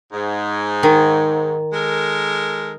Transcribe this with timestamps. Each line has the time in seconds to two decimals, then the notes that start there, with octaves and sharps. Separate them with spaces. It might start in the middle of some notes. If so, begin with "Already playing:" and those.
0.12 G#2
0.83 D#3
1.73 G#3 A4 A#4